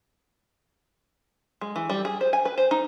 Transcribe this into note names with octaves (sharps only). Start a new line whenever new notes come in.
G#3
E3
G3
G#4
C5
G#5
B4
C5
D#4